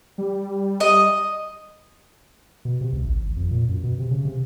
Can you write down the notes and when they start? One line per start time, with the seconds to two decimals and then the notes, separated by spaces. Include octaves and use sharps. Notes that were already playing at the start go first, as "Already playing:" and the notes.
0.18 G3
0.80 D#5
2.65 B2
2.81 C3
2.93 C#2
3.06 A1
3.23 G#1
3.36 F2
3.51 A#2
3.68 F#2
3.83 B2
3.99 C3
4.11 C#3
4.25 C3